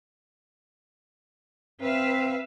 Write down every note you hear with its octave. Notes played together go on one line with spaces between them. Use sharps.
C4 B4 E5 F5